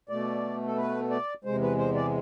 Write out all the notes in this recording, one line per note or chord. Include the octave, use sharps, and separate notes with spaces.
B2 A3 D5
A4
B4
D5
E2 C3 G#3 C5
B4
C5
D5